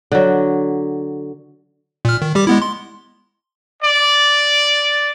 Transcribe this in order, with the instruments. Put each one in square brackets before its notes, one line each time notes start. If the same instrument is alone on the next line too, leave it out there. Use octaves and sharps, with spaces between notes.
[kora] D3 F#3
[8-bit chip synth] A#2 F6
D#3
G3 G4 D6
G#3 B3 E4
C6
[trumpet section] D5